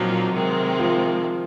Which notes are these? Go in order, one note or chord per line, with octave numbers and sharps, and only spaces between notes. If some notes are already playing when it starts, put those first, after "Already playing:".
Already playing: A#2 F3 F#3 C4 D#4 F#4
C3 D#3 G#3 C4
F3 F4